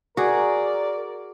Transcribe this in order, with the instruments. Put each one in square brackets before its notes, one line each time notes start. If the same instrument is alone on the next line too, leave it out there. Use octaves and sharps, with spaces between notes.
[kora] F#4 G#4 [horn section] A#4 D5